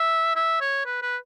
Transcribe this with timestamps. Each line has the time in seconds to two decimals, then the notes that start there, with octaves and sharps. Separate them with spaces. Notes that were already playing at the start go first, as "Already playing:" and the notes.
Already playing: E5
0.36 E5
0.61 C#5
0.86 B4
1.02 B4